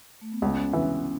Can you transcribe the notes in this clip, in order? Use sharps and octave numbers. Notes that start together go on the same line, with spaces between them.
A3
B3
C#2 C#4
E3